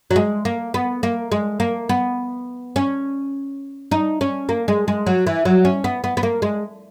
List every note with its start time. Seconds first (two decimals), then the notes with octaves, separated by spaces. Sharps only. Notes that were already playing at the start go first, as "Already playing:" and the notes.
0.11 F#3
0.16 G#3
0.45 A#3
0.74 B3
1.03 A#3
1.32 G#3
1.60 A#3
1.89 B3
2.76 C#4
3.91 D#4
4.21 C#4
4.49 A#3
4.68 G#3
4.88 G#3
5.06 F#3
5.27 E3
5.45 F#3
5.65 C#4
5.84 B3
6.04 B3
6.17 B3
6.23 A#3
6.42 G#3